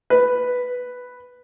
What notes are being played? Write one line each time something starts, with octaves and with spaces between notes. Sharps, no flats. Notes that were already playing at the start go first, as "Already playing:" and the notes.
B4